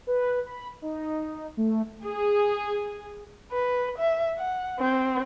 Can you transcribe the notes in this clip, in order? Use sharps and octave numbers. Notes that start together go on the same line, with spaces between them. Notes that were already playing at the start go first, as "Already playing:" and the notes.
B4
B5
D#4
A3
G#4
B4
E5
F#5
C4